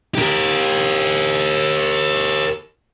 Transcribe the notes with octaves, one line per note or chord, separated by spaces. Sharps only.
G4 A#4